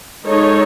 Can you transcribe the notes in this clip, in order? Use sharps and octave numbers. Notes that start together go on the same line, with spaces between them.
G#3 D#4 A4 C#5